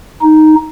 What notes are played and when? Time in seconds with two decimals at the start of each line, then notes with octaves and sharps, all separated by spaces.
0.22 D#4